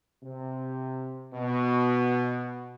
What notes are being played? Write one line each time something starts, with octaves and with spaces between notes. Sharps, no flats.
C3
B2